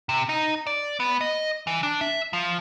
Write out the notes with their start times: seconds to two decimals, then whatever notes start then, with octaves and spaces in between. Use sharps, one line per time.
0.09 C3
0.29 D#4
0.67 D5
1.00 B3
1.21 D#5
1.67 E3
1.83 D4
2.01 E5
2.33 F3